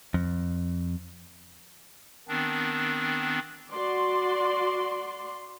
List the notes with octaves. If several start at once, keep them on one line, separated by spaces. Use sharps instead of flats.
F2
D#3 B3 C4 D4
F#4 D5 C6